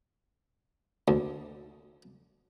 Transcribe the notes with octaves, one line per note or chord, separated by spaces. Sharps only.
D2